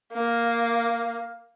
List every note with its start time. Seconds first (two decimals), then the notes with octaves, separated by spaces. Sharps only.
0.14 A#3